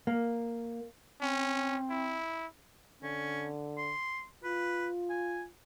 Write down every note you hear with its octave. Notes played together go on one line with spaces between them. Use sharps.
A#3
C4 C#4
E4
D3 C#4
C6
F4 B4
G#5